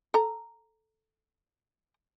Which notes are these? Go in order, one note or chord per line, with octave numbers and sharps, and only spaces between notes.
A4 A#5